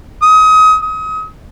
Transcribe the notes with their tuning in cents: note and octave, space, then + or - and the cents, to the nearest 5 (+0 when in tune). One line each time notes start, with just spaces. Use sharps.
D#6 +30
D#6 +35